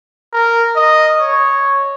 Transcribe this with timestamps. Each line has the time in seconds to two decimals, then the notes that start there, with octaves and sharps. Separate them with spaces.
0.33 A#4
0.76 D#5
1.20 C#5